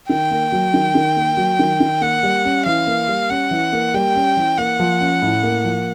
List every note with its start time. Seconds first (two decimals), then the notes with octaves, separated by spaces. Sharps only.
0.09 D#3 G5
0.31 A#3
0.52 F#3
0.74 D#3
0.95 D#3
1.16 A#3
1.37 F#3
1.59 D#3
1.80 D#3
2.01 A#3 F#5
2.23 G3
2.45 C#4
2.65 E3 F5
2.87 A#3
3.08 G3
3.30 C#4 F#5
3.51 E3
3.73 A#3
3.94 G3 G5
4.15 C#4
4.37 E3
4.57 A#3 F#5
4.80 F3
5.00 C#4
5.22 A2
5.43 A#3
5.64 F3